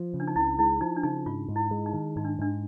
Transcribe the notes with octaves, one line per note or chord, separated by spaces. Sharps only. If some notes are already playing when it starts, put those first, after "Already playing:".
Already playing: F3
C#3
D4
D#4
C#2 E4
G#3 E4
F3 D#4
D4
C#3 D#4
G#2 F4
G#2
E4
G#3
D#4
D#3
G#2 D#4
D4
G#2 D4